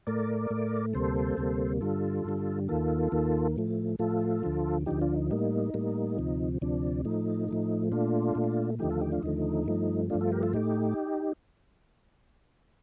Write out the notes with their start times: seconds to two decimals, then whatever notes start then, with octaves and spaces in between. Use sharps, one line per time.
0.07 A2 A3 A#4 D5
0.50 A2 A3
0.93 D2 C3 G3 A#3 A4 C5
1.37 D2 C3 G3 A#3
1.81 G2 D3 G3 F4 A4
2.24 G2 D3 G3
2.68 D#2 D#3 A#3 F4 A4
3.12 D#2 D#3 A#3
3.56 A2 F3 A3
3.99 A2 F3 A3 F4 A4
4.43 D2 D3 F3
4.86 D2 D3 F3 D#4 G4
5.01 D4 F4
5.16 D#4
5.30 A2 G3 A#3 D#4
5.74 A2 G3 A#3
6.17 D2 C3 F3
6.61 D2 C3 F3 D4
7.05 A2 F3 A3 D#4
7.48 A2 F3 A3
7.92 A#2 A3 D4 F4
8.35 A#2 A3
8.79 D#2 D3 F3 A3 D#4 G4
8.90 F4 A4
9.01 D#4 G4
9.12 D4 F4
9.23 D#2 D3 F3 A3 D#4
9.66 G2 F3 A3
10.10 G2 F3 A3 D4 F4
10.21 F4 A4
10.32 G4 A#4
10.43 F4 A4
10.53 A2 A3 D#4 G4